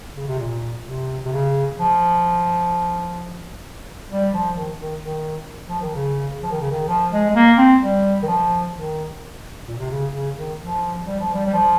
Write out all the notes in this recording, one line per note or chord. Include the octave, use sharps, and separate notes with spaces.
C#3
C3
A#2
C3
C3
C#3
F3
G3
F3
D#3
D#3
D#3
F3
D#3
C#3
F3
D#3
C#3
D#3
F3
G#3
G#3
A#3
C4
G3
D#3
F3
D#3
A#2
C3
C#3
C#3
D#3
F3
G3
F3
G3
G3
F3